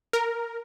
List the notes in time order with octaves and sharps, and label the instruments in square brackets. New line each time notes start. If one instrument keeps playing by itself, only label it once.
[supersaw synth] A#4